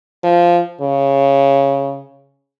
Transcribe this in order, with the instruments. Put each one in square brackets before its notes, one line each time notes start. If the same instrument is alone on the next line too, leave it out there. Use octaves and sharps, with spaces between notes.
[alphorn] F3
C#3